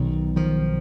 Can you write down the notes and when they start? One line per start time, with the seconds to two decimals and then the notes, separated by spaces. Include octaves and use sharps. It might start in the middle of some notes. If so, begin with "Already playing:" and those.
Already playing: B1 B2 D#3
0.36 D#3 F3